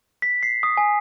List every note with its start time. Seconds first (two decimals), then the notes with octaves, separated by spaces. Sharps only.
0.22 B6
0.43 C7
0.63 D#6
0.77 G#5